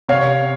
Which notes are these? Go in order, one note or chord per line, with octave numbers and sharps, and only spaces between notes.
C3 C#5 F5